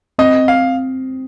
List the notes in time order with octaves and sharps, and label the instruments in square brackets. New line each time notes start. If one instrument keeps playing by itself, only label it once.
[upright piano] C4 [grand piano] D#5
[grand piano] F5